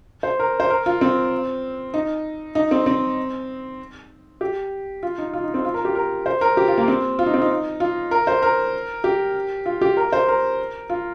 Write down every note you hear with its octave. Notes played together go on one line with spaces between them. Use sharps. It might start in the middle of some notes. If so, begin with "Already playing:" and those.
C5
A#4
C5
A#4
F4
C4
D#4
D#4
C4
C4
G4
F4
D#4
F4
D#4
C4
F4
A#4
G4
A#4
C5
A#4
G4
F4
A#3
C4
F4
D#4
C4
D#4
F4
A#4
C5
A#4
G4
F4
G4
A#4
C5
A#4
F4